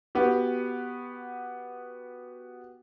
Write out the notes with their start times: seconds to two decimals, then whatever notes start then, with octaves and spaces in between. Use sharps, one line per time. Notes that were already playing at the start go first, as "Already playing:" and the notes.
0.15 B3 F#4 G4